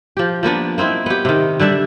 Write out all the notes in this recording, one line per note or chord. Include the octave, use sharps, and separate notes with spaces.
F3 G4
F3 A#3 B3 D4
A#3 C4 D#4 E4
B3 G4
C3 D#3
D3 G3 D4 E5